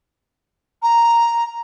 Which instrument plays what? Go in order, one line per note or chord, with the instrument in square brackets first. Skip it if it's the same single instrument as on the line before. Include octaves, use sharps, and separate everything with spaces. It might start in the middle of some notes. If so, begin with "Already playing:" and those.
[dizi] A#5